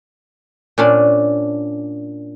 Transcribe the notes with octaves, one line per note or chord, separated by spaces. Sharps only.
A#2 C#4 D4